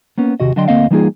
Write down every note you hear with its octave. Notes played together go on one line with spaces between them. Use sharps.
A#3 B3 C#4
D#2 C3 F#4 D#5
D3 F#3 D5 D#5 G5 C6
D2 B2 A#3 C4 D#5 F5
E3 G3 A#3 D#4 F4 G#4